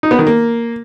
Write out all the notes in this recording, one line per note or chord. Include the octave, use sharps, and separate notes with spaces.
D#4
B3
D#3
A#3